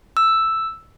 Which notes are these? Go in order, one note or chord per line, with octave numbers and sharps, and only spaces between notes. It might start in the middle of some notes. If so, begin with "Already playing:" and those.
E6